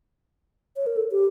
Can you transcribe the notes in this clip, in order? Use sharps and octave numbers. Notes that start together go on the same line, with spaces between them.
C#5
A#4
A4
G4